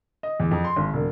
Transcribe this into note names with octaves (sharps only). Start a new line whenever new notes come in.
D#5
E2
F2
C6
G#1
E1